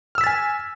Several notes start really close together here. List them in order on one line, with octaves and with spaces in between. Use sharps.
F6 E6 B6 A6 G#5